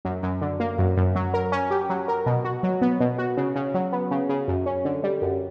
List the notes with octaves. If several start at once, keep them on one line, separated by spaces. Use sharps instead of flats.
F#2
F#2
D3
A#3
F#2
F#2
F#3
A#4
C#4
G4
F#3
A#4
B2
F#4
F#3
B3
B2
F#4
C#3
C#3
F#3
B3
C#3
C#3
F#2
C#4
D3
G3
F#2